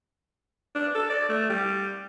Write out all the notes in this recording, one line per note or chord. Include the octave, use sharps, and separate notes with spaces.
D4
A4
D5
A3
G3